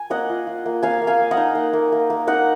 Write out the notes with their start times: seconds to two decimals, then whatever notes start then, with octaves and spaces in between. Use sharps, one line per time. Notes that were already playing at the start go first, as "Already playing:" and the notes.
Already playing: G#5
0.10 A#3 D#5 F#5
0.29 F4
0.47 F4
0.66 A#3
0.83 A#3 F5 G#5
1.02 A#3
1.07 F5 G#5
1.19 A#3
1.31 D#5 F#5
1.37 D#4
1.55 A#3
1.73 A#3
1.92 A#3
2.10 A#3
2.27 D#4 D#5 F#5